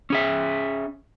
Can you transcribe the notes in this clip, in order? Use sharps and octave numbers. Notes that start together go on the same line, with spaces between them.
C#4 G#4 E5